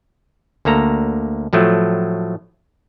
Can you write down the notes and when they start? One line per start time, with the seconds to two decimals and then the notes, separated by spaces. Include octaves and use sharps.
0.65 D2 A#3 A4 A#5
1.53 A2 F3 F#3 A3